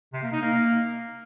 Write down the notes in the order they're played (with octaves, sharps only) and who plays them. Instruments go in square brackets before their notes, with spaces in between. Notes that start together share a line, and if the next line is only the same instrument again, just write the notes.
[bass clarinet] C3
A#3
D#4
A#3